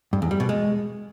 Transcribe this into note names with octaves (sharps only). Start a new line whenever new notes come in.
G2
E2
G3
B2
G#3